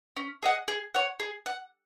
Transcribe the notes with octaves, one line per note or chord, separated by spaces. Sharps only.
C#4
G#4 D#5 F#5
G#4
C#5 F#5
G#4
F#5